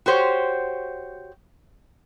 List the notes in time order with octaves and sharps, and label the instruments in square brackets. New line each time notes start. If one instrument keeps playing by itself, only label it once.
[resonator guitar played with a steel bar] F#4 G4 C5 C#5